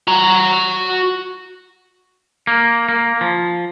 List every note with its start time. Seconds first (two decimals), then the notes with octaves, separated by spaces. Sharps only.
0.08 F#4 A#5
2.47 A#3
2.89 A#3
3.21 F3